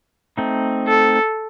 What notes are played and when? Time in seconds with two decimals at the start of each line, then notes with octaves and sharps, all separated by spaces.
0.38 A3 C4 D#4
0.88 A4